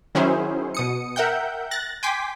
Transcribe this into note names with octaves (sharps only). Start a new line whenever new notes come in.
D#3 F#3 C#4 E4 G#4 C5
B2 D#6 C#7
A#4 E5 F#5 G5 G6
F#6 A6 A#6
G5 G#5 C6 D6 B6